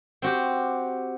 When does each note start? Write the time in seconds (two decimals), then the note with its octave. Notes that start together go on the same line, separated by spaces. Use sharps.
0.22 C4 F#4 G4